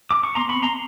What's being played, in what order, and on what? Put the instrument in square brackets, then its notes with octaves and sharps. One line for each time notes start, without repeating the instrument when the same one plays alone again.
[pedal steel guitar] D6
C#6
[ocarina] B3 [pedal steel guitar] A#5 C6
[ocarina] B3
[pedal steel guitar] B5 C#6
[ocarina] C4
[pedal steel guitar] A#5 C6